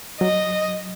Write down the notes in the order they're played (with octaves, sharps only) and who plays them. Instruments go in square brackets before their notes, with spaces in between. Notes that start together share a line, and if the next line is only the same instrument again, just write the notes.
[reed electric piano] F#3 [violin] D#5